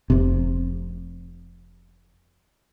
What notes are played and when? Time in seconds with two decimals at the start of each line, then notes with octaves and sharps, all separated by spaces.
0.10 F1 C3